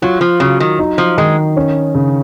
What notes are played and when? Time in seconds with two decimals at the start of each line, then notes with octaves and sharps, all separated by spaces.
0.02 F#3 F4
0.21 F3
0.40 C#3 F#3
0.60 D#3
0.79 D#4
0.98 F3
1.18 D#3 G#3
1.57 C#4
1.95 C#3